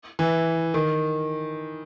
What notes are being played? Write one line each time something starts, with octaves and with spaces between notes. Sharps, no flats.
E3
D#3